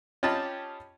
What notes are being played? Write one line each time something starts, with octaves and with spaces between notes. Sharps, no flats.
C#4 F4 G4 D#5 A5 B5